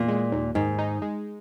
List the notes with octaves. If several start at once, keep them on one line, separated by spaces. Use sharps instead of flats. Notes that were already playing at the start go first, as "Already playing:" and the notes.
Already playing: E2 A#2
G#3
D#2
G#2 D#3
D#4
G#3